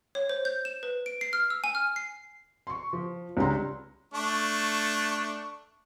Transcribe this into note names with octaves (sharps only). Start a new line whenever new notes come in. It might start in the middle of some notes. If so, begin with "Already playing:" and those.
C#5
C5
G6
E7
B4
D7
C7
F6
E6
G#5
F6
C7
C6 C#6
F3
C#2 D4 G4 C#5 A#5 C6
A3 D4 C#6